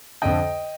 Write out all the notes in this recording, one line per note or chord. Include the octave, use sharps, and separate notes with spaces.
F2 D3 D#5 G5